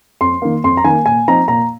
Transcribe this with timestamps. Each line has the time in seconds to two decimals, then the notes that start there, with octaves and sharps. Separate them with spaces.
0.21 F2 C6
0.42 D#3 A#3
0.64 F2 C6
0.77 A#5
0.84 D#3 A#3 G#5
1.06 A#2 G#5
1.28 F3 C4 D#4 A#5
1.48 A#2 A#5